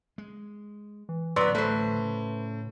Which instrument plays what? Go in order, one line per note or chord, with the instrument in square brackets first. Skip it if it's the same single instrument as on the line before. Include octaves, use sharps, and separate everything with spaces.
[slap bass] G#3
[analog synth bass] E3
[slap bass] D1 A1 [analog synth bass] A2 [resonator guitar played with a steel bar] F#3 B3 [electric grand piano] B4 D5 C6
[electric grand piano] A3 [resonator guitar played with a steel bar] B4 C5
[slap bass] C#3